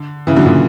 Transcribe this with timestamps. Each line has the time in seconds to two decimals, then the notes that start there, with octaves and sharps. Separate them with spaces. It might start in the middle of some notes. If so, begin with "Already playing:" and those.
Already playing: D3
0.27 C#3 E3
0.36 D3 F#3
0.46 A#2 C#3